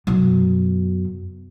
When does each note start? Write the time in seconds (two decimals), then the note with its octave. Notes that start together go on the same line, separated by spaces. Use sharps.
0.07 F#2 B2